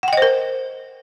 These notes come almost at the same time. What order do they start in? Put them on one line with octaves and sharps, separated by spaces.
F#5 G5 D#5 C5 A#4